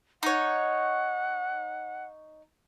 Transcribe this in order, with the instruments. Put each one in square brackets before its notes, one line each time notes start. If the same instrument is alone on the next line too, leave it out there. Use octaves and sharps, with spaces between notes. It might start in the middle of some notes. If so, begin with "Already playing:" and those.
[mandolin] D#4 C#5 [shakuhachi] F#5